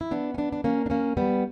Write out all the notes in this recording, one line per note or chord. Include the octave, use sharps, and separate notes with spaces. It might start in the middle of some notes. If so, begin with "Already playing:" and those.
E4
B3 D4
C#4
B3 D4
D4
A#3 C#4
D4
A#3 C#4
G3 B3